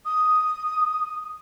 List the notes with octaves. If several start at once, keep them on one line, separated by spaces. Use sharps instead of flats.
D#6